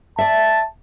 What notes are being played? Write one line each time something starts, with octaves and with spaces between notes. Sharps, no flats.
D5 E5 A5